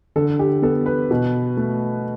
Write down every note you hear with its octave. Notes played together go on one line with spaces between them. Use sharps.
D3 A4
G4
B3 A4
B4
B2
A3